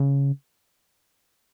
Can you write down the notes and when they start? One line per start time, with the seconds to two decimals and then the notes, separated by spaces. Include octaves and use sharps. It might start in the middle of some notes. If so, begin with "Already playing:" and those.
Already playing: C#3